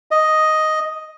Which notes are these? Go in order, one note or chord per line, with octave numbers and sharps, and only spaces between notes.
D#5